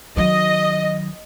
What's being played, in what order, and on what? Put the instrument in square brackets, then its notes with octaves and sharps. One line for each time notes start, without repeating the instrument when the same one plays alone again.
[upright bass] D#3 F#3 [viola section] D#5